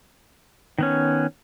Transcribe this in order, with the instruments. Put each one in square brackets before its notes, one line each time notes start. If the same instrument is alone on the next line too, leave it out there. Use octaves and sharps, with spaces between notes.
[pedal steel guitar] D#3 B3 C#4